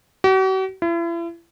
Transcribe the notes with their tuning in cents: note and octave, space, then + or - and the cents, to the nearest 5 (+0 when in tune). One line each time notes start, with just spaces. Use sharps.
F#4 +45
E4 +40